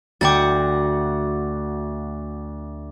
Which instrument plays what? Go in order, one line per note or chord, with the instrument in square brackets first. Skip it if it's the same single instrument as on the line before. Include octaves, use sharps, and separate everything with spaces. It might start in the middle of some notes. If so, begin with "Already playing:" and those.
[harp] D2 G5 [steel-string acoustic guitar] F#4 F#5 [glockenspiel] D6 A6